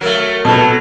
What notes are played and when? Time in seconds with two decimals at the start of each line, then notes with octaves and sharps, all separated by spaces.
0.01 F#3 A3 A#4
0.45 B2 F#3 B3 A4 A5